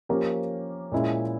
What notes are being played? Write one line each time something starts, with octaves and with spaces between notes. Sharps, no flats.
F3 A#3 C#4 G4 A#4
A#2 G#3 C#4 E4